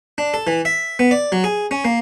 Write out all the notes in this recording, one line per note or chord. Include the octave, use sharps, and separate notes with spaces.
D4
A4
E3
E5
B3
D5
F#3
G#4
C#4
A#3